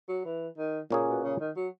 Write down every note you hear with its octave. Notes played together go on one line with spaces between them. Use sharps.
F#3
E3
D#3
A#2 C#3 A#3 C#4 G#4
B2
C#3
D#3
F#3